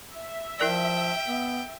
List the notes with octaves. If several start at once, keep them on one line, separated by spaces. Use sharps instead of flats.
E5
F3 E4 A#4 D5 G5
B3